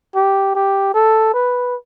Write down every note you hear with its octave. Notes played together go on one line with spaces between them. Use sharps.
G4
G4
A4
B4